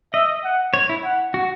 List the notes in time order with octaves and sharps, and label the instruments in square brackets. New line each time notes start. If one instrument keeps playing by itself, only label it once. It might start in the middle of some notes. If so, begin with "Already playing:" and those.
[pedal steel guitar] D#5 [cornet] E5
[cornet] F#5
[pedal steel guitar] C#5
E4
[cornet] F#5
[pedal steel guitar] F#4